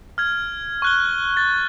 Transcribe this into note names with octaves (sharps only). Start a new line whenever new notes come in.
F6 G#6
C#6 F#6 G7
A6